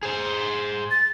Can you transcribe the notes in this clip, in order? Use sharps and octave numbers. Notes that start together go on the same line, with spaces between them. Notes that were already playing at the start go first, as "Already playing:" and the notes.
G#4 C5
A6